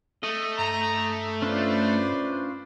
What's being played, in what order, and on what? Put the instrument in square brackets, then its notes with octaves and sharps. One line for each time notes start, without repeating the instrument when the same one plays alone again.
[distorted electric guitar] A3 [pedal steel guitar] D#5
[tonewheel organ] G2 [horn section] A#5
[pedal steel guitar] C#4 D4 F4 [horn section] B4 C5 D5